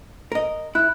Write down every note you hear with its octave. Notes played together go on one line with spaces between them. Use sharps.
A#4 D#5
E4 F#6